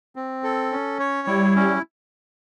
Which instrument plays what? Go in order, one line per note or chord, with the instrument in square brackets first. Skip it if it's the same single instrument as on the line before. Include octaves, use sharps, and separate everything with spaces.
[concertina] C4
A4
C#4
C#5
[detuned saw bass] G3 [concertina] E4
[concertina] C#4